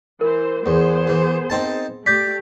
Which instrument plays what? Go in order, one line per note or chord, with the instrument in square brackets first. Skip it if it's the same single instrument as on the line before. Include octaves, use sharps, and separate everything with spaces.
[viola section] E3 C5 [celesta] A#4
[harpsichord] E2 [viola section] B3 G#4 C5
[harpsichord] E3
C4 D#4 A5
[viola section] A3 G4 [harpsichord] D5 [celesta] G6 B6